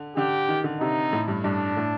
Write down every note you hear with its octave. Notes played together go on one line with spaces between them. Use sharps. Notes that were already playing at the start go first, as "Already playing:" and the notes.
Already playing: D3
D3 G4
D#3
D3
C3 D#4
A2
G2
G2 D4
A2